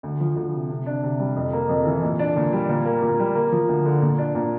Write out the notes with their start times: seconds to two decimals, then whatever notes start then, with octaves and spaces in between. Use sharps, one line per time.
0.03 D2
0.20 F3
0.36 D2
0.53 C3
0.70 C3
0.86 D4
1.03 C3
1.20 G3
1.36 F2
1.53 A#3
1.69 F2
1.86 E3
2.03 A#2
2.19 D4
2.36 A#2
2.53 G3
2.69 A#2
2.85 A#3
3.02 A#2
3.19 G3
3.35 A#3
3.52 F3
3.69 D2
3.86 D3
4.02 A#2
4.18 D4
4.35 A#2